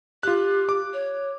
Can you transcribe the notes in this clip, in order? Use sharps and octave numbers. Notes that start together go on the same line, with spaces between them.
F4 G4 F#6
D6
C#5